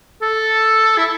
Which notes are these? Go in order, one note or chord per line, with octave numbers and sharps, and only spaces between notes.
A4
E4